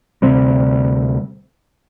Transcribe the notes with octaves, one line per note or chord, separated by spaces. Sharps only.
D2 C3 G3 C4